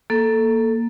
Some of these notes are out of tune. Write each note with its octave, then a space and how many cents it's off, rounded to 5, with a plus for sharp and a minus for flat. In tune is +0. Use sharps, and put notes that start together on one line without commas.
A#3 +0 A4 +0